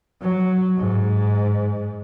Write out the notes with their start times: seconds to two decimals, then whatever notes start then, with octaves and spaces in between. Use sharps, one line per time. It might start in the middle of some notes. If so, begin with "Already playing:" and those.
0.22 F#3
0.78 G#2